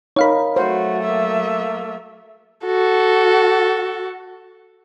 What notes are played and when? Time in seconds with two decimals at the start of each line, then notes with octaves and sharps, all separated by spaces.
0.16 D#4 A#4 C#5 F5 B5
0.56 F#3 A3 F#4 C5
1.04 A#3 E5
2.66 F#4 A4